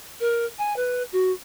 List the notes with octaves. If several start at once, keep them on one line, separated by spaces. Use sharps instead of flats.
A#4
G#5
B4
F#4